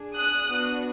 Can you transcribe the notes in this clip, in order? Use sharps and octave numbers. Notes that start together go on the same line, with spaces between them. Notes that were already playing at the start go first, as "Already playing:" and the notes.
Already playing: D4 G#4
D#6 F#6
B3 D4 F#4